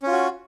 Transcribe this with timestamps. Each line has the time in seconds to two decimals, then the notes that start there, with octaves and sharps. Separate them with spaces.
0.03 C#4
0.07 F4
0.12 F#4